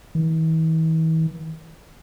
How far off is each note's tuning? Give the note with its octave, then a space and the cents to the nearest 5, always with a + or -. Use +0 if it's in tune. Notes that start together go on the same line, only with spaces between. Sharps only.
E3 -45